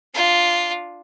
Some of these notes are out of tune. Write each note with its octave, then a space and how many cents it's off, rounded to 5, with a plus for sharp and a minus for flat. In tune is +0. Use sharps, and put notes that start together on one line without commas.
D4 +0 F4 +0